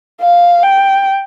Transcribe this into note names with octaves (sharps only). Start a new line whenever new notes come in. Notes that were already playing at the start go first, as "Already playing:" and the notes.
F5
G5